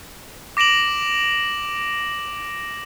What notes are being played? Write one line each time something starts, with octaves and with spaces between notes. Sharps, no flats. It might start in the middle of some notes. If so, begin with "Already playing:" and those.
D6 A#6 D7 E7 F#7